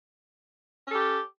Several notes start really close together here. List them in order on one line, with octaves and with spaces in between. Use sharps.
C#4 A4 G4